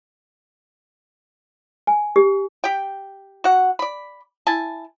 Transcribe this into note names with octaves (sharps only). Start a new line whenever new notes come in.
G#5
G4
G4 G5
F#4 F#5
D5 B5
E4 G#5 A5